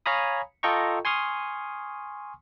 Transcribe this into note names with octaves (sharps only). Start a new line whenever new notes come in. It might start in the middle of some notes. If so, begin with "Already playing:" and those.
C#5 F5 G#5 A#5 B5 D#6
F4 A4 D#5 G5 A#5 C#6
G#5 C6 C#6 D#6 F6